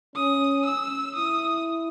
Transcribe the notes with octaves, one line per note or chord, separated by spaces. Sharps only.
C#4 D#6
E6
E4 D#6